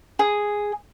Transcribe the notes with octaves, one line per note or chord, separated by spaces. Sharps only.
G#4